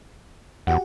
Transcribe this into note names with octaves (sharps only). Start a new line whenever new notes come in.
E2 F#4 G4 F#5